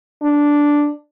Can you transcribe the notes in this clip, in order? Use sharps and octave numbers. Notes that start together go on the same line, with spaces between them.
D4